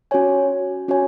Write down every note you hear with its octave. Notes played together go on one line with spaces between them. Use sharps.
C#4 F#4 C#5 G#5
C#4 F#4 C#5 G#5